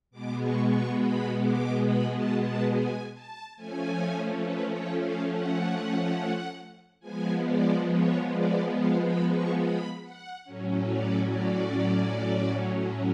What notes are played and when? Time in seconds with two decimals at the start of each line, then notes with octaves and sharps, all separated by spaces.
0.11 B2 G#3 B3 D6
0.40 C#6
0.68 C#6
0.97 B5
1.40 D6
1.84 B5
2.13 A5
2.41 A5
2.70 G#5
3.13 A5
3.55 F3 A3 C#4 G#5
4.41 B4
4.71 C#5
4.99 F5
5.27 F#5
7.00 F3 G#3 B3 G#5
7.43 D5
7.86 C#5
8.30 D5
8.73 F5
9.01 B5
9.29 C#6
9.58 B5
10.01 F#5
10.44 A2 F#3 C#4
10.87 D5
11.30 D5